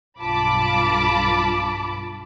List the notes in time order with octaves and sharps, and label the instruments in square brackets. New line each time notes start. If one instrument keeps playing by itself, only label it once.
[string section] B1 G2 F4 A5 B5 D6